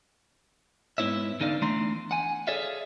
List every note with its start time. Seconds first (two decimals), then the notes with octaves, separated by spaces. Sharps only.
0.98 G#2 B3 E4 C#5 E5
1.40 E2 D3 D#4 D5 F5
1.62 E2 E3 A3 D4 A#5 C6
2.11 F#5 G#5
2.47 G#4 A4 C#5 D5 E5 F5